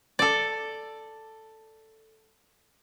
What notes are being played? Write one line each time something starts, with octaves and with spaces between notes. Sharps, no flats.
A4 D5